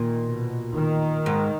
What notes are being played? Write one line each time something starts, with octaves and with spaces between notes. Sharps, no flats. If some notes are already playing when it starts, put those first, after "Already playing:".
Already playing: A#2 D#3
B2
D#3
G#2